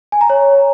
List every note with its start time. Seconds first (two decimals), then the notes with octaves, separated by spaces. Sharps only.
0.12 G#5
0.21 A#5
0.30 C#5